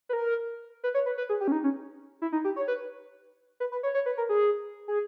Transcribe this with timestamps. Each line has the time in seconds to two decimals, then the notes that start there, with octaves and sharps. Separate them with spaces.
0.09 B4
0.13 A#4
0.84 B4
0.94 C#5
1.06 B4
1.18 B4
1.29 G#4
1.41 G4
1.48 C#4
1.52 D#4
1.64 C#4
2.22 E4
2.32 D#4
2.45 G4
2.56 C#5
2.68 B4
3.60 B4
3.72 B4
3.83 C#5
3.94 C#5
4.06 B4
4.17 A#4
4.29 G#4
4.88 G#4